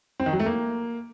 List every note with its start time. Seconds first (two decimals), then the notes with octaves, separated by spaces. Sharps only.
0.20 C4
0.26 D#3
0.33 F#3
0.40 A3
0.46 A#3